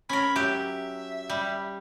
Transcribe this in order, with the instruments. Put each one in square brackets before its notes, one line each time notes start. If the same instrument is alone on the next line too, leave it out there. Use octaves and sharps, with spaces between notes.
[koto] C#4 A#4 [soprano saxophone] B5
[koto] F#3 G4 [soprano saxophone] E5
[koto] G3